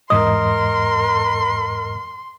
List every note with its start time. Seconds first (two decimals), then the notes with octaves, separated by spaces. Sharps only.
0.10 E2 G#2 A#4 D#5 C6 D#6